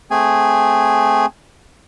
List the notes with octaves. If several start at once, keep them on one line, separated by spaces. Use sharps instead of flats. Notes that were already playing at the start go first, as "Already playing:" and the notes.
A3 C4 G#4 G#5